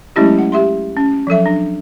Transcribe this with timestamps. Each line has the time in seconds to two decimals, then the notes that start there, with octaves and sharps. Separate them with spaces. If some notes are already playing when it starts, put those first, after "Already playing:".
0.16 F#3 G#3 A3 C#4 E4 G4
0.38 F#5
0.52 G4 E5 C6
0.97 C#4
1.27 F3 F#3 A4 E5
1.46 D4